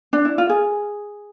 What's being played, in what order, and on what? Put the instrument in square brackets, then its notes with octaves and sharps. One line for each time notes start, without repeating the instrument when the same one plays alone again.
[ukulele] D4
E4
F4
G#4